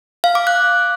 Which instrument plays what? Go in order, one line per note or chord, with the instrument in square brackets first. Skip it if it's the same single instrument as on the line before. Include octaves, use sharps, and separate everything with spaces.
[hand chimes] F5
D6
F#6